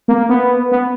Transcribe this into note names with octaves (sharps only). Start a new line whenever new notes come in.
A#3
B3
B3